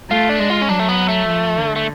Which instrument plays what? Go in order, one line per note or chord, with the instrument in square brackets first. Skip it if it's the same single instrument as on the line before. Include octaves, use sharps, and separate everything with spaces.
[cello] A3 [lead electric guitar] F4
[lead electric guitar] D4
[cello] G#3
[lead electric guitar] F4
C#4
[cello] F#3 [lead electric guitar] D4
[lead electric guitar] A3
B3
A3
[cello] F3
D3
[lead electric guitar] A3